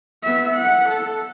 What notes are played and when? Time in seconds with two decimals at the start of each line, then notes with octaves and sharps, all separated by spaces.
0.23 B3 E5
0.55 F#5
0.89 A4